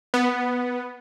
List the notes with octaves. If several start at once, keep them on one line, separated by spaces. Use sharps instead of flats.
B3